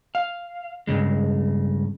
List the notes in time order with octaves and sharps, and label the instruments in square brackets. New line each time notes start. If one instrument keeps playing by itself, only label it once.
[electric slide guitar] F5
G2 C#3 G#3